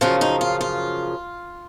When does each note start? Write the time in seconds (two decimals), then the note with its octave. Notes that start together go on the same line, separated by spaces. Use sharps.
0.01 F#2 C#3 F3 F4
0.21 D#4
0.41 F4
0.61 F4